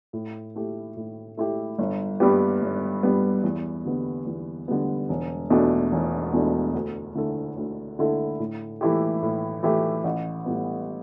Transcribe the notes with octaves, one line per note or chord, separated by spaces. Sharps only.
A2
A3 E4 G4
A2
A3 E4 G4
G1
G2 G3 B3 G4
G1
G2 G3 B3 G4
E2
D3 G3 B3
E2
D3 G3 B3
E1
E2 B2 A3 D4
E1
E2 B2 A3 D4
D2
D3 A3 E4 A4
D2
D3 A3 E4 A4
A2
E3 A3 E4 G4
A2
E3 A3 E4 G4
A1
A2 G3 B3